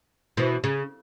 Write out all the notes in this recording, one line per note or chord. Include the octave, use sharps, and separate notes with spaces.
B2 E3
C#3